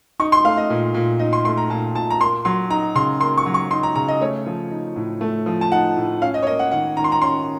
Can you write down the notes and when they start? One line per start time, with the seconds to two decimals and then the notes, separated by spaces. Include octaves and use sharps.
0.20 D#4 C#6
0.32 C6
0.45 A3 F5
0.57 D#5
0.70 A#2
0.94 A#2
1.19 D#4 D#5
1.33 C6
1.45 A3 C6
1.57 A#5
1.70 A#2 A5
1.95 A#2 A5
2.10 A#5
2.20 A#3 C6
2.45 F#3 C6
2.70 D#4 A#5
2.95 C#3 C6
3.21 A#3 C6
3.37 C#6
3.46 F#3
3.54 C#6
3.71 D#4 C6
3.83 A#5
3.95 C#3 A#5
4.08 D#5
4.21 A3 C#5
4.46 F3
4.71 D#4
4.96 A2
5.21 A3
5.46 F3
5.61 A5
5.71 D#4 F#5
5.97 A2
6.21 C#4 F5
6.34 D#5
6.42 C#5
6.46 A#3 D#5
6.59 F#5
6.71 D#3 F#5
6.96 D#3 A#5
7.04 C6
7.12 A#5
7.21 C#4 C6